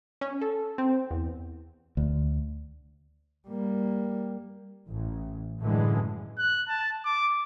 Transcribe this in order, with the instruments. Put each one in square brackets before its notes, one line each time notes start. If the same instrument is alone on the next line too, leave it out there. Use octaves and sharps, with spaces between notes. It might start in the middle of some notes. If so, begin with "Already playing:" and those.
[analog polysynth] C#4
A4
C4
E2
[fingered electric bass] D2
[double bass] G3 A#3
[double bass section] A1
F#2 A2 D3 E3 G#3
[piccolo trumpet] F#6
A5
D6